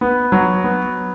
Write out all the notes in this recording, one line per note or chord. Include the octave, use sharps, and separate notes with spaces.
B3
F#3
B3